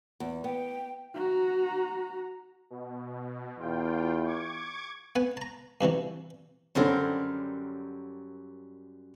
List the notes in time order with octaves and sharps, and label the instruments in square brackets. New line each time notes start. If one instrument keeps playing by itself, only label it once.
[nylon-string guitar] E2
[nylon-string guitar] B3 [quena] G5
[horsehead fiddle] F#4 A#5
[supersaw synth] B2
[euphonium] E2 [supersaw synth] F4 G5
[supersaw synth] C#6 D6 G#6
[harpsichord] B3 F#5 G#5
A5 A#5
G2 C3 E3 F#3
[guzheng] F#2 G3 A#4 [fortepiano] D3 C4 C#4